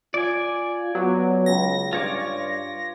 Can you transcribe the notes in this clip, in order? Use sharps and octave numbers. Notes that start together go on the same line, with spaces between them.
F4 D5 G#5
F#3 B3
C#2 A#6
G2 F4 C#5 D6